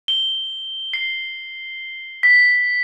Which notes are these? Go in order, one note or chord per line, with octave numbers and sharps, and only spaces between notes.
G7
C7
B6